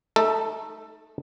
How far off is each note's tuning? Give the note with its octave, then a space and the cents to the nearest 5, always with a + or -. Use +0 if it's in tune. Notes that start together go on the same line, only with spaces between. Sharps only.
A3 -20 D#4 +0 A4 +15